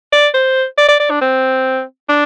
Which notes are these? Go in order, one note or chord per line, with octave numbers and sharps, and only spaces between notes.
D5
C5
D5
D5
D5
D4
C4
D4